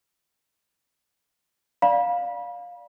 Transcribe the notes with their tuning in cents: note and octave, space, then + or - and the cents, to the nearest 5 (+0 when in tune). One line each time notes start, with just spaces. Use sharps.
D5 +0 F5 +15 B5 -35